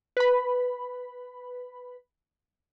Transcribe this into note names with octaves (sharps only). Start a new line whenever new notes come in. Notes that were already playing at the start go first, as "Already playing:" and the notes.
B4 B5